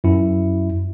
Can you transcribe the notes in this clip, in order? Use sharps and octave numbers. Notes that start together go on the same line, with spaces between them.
F#2 E4